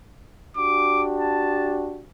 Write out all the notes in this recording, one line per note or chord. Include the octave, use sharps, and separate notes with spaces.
D4 F#4 G4 D6
A5